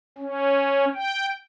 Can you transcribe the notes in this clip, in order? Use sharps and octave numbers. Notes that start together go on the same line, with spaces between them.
C#4
G5